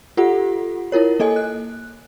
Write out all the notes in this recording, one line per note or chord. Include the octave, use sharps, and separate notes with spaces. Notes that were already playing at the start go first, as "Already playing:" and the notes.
F4 G4 A4 F#5
E4 F4 A#4 C#5
A#3 A4 D#5 G#5
F#6